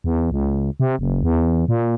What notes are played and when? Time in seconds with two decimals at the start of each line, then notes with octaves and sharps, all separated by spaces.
0.04 E2
0.31 C#2
0.80 C3
0.99 F#1
1.23 E2
1.68 A#2